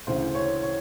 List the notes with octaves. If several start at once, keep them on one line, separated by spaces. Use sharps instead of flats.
D2 C#3 E3 C5
C#5
C#5